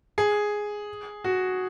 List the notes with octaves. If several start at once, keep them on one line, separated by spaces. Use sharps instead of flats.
G#4
F#4